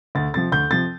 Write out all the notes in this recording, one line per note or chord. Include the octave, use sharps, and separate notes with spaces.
D2 A6
C3 F3 A6
D2 G6
C3 F3 A6